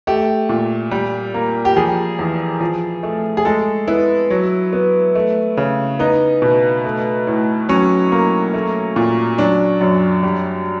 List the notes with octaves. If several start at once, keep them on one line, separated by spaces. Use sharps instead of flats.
A3 G4
A#2
G3
A#3
G4
F3 G#4
E2
F3
A3
G#4
G#3 A4
B3 E4
F#3
B3
A3
C#3
B3 D#4
B2
A3
A2
F#3 C#4
A#3
A3
A#2
F#3 D4
F#2
G3